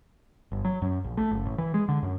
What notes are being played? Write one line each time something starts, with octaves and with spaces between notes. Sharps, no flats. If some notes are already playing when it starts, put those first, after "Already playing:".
G1
F#3
F#2
A#1
A3
F#1
A1
E3
G#3
D3
F#2